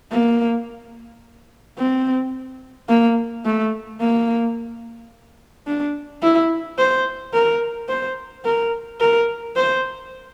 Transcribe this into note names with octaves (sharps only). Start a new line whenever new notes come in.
A#3
C4
A#3
A3
A#3
D4
E4
C5
A#4
C5
A#4
A#4
C5